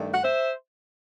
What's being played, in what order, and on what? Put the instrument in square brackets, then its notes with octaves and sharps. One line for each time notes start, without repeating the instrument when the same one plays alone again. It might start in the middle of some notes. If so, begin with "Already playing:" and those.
Already playing: [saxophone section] G2 D#3 A3
F#5
C5 E5